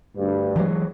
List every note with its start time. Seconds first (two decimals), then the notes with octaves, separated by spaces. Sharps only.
0.16 D2 G2
0.56 E3 F#3 G#3